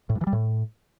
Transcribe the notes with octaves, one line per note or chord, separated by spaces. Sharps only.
A2
G2
E3
G3
A2